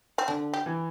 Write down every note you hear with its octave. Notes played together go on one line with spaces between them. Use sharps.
C4
D3 D4
G4
E3